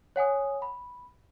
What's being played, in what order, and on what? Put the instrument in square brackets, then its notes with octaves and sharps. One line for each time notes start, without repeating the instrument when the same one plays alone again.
[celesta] C#5 F#5 G#5 D#6
B5